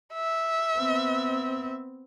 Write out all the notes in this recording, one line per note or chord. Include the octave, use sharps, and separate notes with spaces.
E5
B3 C4